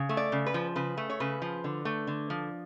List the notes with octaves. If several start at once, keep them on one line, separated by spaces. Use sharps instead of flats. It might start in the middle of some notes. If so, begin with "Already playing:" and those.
Already playing: C#3
A3
D5
C#3
B4
F3
C#3 B4
A3
C#5
C#3 B4
F3
D3
A3
D3
F3